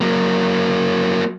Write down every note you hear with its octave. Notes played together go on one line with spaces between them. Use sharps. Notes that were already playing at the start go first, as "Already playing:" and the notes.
F#3 A#3